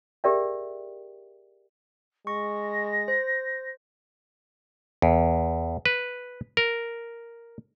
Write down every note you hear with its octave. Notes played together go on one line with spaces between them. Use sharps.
G4 G#4 A#4 D5 E5 G5
G#3 C#6 A#6
C5
E2
B4
A#4